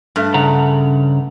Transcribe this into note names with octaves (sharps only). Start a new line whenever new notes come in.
G2 A3
C#3 F#5 A#5